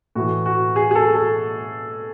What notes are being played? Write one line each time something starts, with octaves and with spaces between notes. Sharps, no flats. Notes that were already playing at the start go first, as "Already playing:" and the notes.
A2 E3 F#4
F#4
G#4
G#4
A4
A4